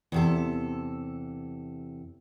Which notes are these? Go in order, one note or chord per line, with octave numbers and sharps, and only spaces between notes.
E2 C3 A4